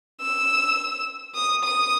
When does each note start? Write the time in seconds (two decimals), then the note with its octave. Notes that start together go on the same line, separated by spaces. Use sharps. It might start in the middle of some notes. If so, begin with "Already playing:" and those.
0.21 E6
1.35 D#6
1.64 D#6